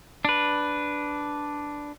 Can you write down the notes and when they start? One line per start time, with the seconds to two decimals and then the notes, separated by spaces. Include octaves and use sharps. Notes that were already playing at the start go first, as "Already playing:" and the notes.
0.25 D4 B4